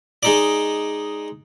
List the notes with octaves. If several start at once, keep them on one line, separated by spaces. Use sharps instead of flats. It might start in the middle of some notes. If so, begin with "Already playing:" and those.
G#3 D#4 D5